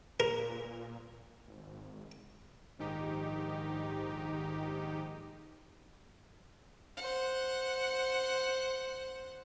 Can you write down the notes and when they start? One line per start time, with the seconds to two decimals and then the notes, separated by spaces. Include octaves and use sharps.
0.20 A#2 A#4
1.48 G#1
2.79 A#1 G#2 D#3 D#4 G4
6.97 C5 F#5